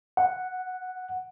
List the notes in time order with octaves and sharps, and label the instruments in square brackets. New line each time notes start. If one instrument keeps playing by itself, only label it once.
[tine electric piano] F#5